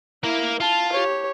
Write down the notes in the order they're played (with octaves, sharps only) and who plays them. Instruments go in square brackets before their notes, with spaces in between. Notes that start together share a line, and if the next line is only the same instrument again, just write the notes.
[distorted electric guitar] A#3 A#4 [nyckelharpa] E4
[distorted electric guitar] F4 [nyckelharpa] A5
[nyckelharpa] G4 C#5